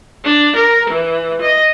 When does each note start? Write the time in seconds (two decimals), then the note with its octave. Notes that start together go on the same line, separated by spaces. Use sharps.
0.24 D4
0.56 A#4
0.90 E3
1.41 D#5